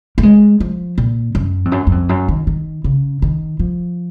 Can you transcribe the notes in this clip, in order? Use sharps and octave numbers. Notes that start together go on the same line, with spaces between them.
A#3
G#3
F3
A#2
F#2
F2
F#2
F#2
F2
F#2
D#3
D#3
C#3
D#3
F3